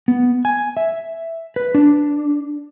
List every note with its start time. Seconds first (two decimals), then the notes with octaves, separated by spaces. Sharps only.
0.08 B3
0.45 G#5
0.77 E5
1.56 B4
1.75 D4